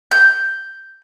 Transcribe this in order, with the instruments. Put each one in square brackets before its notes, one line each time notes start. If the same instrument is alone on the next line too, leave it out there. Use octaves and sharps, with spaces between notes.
[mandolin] G6